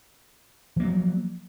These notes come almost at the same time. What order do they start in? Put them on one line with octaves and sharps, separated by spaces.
F3 A#3 F#3